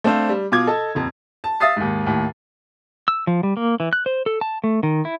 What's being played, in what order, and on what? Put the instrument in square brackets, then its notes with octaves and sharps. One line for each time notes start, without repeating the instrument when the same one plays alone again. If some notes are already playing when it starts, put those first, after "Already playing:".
[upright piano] A3 C4 D4 C5 F5
G3
B2 F4 D6 G#6
A4 D#5 A5
D#1 F2
A5
E5 F5 D#6 A6 C7
D#2 G#2
D#2 A2
[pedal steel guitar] E6
F3
G3
A#3
E3
F#6
C5
A4
A5
A3
D#3
E4